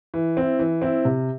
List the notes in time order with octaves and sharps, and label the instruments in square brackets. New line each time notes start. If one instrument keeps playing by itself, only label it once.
[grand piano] E3
C4 E4
E3
C4 E4
C3